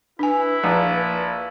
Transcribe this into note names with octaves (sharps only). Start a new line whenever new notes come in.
D4 E4 B4 G#5
A#1